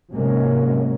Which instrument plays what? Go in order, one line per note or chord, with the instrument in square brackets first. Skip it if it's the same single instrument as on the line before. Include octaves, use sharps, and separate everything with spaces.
[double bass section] G#2 C3 F#3 G#3 A#3 C#4